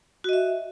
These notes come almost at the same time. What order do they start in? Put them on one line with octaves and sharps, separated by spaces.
F#4 D#5 E5